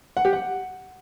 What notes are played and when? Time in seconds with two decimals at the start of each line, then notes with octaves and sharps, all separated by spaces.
0.17 F#5
0.25 G4
0.33 F#5